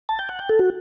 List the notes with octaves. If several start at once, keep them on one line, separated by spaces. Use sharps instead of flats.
A5
G5
F#5
G5
A4
F#4